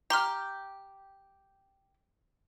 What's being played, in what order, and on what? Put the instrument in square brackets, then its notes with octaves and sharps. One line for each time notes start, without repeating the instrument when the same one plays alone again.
[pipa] G4 [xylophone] A#5 C6 F6